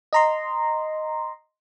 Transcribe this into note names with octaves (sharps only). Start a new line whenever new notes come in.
D#5 A#5 C6